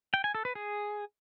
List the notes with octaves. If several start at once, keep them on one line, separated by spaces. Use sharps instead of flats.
G5
G#5
A4
B4
G#4